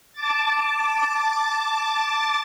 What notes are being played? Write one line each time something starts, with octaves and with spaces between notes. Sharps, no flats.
A5 D6 A6